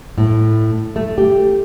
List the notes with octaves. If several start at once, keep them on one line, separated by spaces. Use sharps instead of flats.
A2
A3
G4